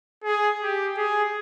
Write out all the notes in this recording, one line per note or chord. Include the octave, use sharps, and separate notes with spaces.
G#4
G4
G#4